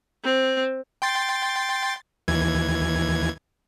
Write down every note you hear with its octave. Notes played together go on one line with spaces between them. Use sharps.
C4
G5 C6 A6
D#2 E3 G#6